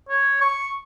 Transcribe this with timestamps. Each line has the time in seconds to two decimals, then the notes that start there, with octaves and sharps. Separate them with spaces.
0.09 C#5
0.41 C#6